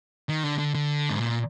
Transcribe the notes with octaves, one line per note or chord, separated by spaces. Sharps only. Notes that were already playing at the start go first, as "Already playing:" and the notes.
D#3
D3
D3
D3
G#2
A#2